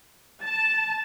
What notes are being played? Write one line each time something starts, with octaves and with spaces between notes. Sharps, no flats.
A5